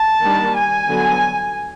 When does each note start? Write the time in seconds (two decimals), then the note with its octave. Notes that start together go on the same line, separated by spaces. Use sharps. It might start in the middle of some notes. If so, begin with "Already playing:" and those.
Already playing: A5
0.23 D#3 G3 A#3 D4
0.56 G#5
0.88 D3 F#3 B3